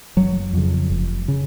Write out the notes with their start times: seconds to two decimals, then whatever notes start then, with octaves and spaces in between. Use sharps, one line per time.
0.16 F#1 F#3
0.53 F2 C#3
0.90 F1
1.28 C#3